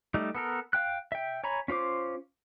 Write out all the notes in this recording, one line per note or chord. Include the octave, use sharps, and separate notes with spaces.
G3 A3 D#4
B3 A4 A#4
F5 G5 F#6
E5 G5
C#5 G#5 A#5 B5
C#4 F4 C5 D6